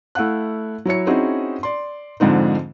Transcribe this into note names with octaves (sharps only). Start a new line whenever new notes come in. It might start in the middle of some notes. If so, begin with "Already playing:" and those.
A3 E4 F5 F#5 F#6
F#3 E4 C#5 C#7
C4 C#4 D#4 E4 F#4 G#4
D5 C6
F2 G#2 D3 C4 D#4